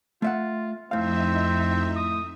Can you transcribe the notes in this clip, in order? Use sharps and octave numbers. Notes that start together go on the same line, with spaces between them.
A3 F4 E5 F#5
F2 A2 C4 D#4 E5 F5
D#6